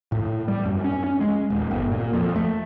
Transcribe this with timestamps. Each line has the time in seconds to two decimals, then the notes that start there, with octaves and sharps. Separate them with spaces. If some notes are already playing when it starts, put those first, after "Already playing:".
0.12 A2
0.48 G3
0.65 F#2
0.84 C#4
1.04 C#4
1.21 G#3
1.50 D#1
1.71 G1
1.92 A#2
2.13 F2
2.36 A3